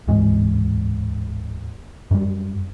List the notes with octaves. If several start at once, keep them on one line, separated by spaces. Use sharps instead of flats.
D1 E2 G#2 G#3
F#2 G3